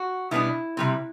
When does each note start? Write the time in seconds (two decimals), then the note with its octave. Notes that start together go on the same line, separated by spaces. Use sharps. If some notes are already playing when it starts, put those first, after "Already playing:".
Already playing: F#4
0.31 B2 G3 B3 D4 E4
0.77 C3 G3 C4